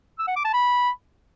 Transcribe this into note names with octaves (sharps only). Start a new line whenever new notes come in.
E6
F#5
D6
A5
B5